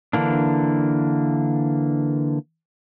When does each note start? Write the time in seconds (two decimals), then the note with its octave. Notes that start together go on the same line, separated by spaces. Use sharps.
0.13 D3 E3 A#3 D4